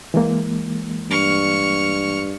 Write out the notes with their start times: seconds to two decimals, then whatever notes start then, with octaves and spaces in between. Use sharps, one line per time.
0.14 E3 G#3 A#3
1.10 G2 C#6 F6